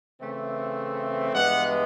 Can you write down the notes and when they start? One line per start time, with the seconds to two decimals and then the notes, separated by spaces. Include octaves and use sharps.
0.20 C#3 E3 A3 C4
1.34 G2 E3 G#3 B3 F#5